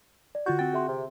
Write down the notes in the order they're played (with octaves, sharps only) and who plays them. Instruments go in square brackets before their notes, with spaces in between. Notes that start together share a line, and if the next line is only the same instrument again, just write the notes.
[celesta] D5
[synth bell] D3 F4 G6 [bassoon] F#4 [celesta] C#6
[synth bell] C4 G5 [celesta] A6
[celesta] G#4 E5 C6
[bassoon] C3